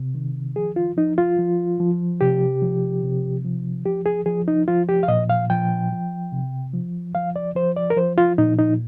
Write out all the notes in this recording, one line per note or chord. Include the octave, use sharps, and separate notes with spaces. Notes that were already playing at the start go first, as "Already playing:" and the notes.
Already playing: C3
D#3
F3 G#4
F4
F3 D#4
F4
F3
F3
C3 G4
F3
C3
F3
F3 G4
G#4
F3 G#4
D#4
F3 F4
G4
F5
A#2 D#5
F5
F3 G5
F3
C3
F3
F3 F5
D5
F3 C5
D5
A#4
F3 C5
F4
A#2 D#4
D#4